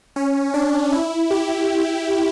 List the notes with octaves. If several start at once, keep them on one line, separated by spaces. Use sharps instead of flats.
C#4
D4
E4
G4